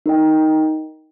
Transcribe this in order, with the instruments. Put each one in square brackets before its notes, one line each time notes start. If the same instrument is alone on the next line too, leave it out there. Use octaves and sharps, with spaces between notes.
[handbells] D#4 A#4 D#5 G5